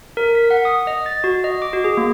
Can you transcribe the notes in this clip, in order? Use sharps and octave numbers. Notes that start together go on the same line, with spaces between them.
A#4
B6
F#5
D#6
D#5
A6
F#4
D#5
D6
F#4
G#4
A#3